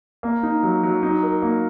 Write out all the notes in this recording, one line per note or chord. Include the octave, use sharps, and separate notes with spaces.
A#3
D#4
F#3
F#3
D#4
A#4
A#3